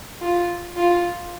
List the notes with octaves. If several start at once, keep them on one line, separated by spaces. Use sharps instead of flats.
F4
F4